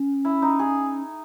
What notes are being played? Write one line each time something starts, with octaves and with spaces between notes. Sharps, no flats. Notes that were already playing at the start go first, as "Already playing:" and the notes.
Already playing: C#4
E4
D#4
G#4